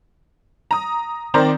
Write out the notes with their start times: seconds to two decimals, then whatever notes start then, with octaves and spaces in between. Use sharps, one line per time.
0.71 A#5 D#6
1.34 D#3 C4 C5 D5 A#5